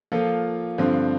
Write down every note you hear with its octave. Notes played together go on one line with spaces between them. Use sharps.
F3 A#3 F4 A4
G2 D3 F3 C4